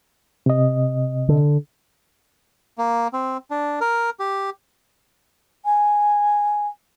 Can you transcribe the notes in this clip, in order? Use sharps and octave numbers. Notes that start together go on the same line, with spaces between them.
C3 D#5
D3
A#3
C4
D4
A#4
G4
G#5